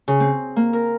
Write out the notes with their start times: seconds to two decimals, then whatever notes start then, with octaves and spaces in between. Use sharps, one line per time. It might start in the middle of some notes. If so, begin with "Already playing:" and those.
0.08 C#3
0.20 C4
0.56 A#3
0.73 A#4